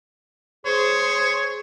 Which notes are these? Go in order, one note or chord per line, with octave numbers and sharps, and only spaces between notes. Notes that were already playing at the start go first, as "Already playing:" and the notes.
G#4 C5 C#5